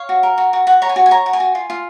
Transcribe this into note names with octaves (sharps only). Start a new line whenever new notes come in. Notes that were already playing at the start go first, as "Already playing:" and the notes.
Already playing: C#5 F5
F#4
A#4
F#4
F#4
F#4 F#5
C#5 A#5
G#5
F#4
G#5
C#5 A#5
F#4
G#5
F#4
F4
F4